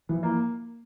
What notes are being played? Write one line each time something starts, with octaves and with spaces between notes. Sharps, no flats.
E3 F3
A#3